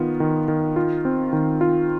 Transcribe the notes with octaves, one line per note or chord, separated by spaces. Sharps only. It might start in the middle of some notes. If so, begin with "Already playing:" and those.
Already playing: D#3 B3 F4
D#3
D#3
F4
C4
D#3
F4